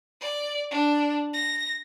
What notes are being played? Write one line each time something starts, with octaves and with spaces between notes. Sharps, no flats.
D5
D4
A#6